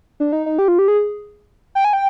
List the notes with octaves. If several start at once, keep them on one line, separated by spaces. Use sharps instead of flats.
D4
D#4
D#4
G4
F4
G4
G#4
G5
G#5
G5